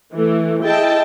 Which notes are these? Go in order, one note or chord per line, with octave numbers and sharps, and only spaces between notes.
E3 A3
E4 G#4 D#5 G5 A5